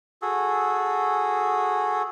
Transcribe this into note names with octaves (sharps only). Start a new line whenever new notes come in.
F#4 G#4 A4